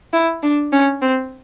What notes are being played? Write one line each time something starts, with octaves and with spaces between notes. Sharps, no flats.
E4
D4
C#4
C4